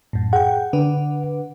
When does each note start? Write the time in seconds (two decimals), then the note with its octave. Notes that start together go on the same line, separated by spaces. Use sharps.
0.13 F#2 A2
0.33 G#4 F#5 G5
0.73 D3 D4 B4